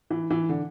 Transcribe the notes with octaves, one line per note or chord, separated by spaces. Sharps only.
E3
E3
D3